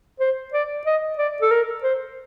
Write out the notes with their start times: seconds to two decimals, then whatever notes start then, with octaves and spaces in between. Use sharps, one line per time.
0.20 C5
0.53 D5
0.86 D#5
1.18 D5
1.42 A4
1.51 A#4
1.83 C5